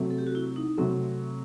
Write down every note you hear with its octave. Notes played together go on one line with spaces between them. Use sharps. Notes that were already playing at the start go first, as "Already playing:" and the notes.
Already playing: C3 F#3 A3
A4
G4
F#4
E4
D#4
C3 F#3 A3 C4